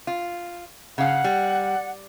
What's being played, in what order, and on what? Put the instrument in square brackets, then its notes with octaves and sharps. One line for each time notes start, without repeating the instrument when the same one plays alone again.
[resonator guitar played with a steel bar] F4
[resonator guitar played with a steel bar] C#3 F5 [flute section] F#5
[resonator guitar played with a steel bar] G3